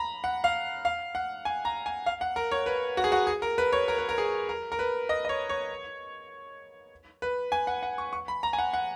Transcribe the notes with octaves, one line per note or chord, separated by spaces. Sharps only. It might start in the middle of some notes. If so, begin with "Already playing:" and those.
Already playing: A#5 B5
F#5
F5
F5
F#5
G#5
A#5
G#5
F5
F#5
A#4
C#5
B4
F#4
G#4
F#4
G#4
A#4
B4
C#5
A#4
B4
A#4
G#4
A#4
A#4
B4
D#5
D#5
C#5
C#5
B4
G#5
F#5
F#5
C#6
C#6
B5
A#5
G#5
F#5
F#5